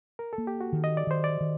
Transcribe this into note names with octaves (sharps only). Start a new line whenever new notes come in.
A#4
A4
A#3
G4
F#4
D#3
D#5
D5
D#3 C5
D5
D#3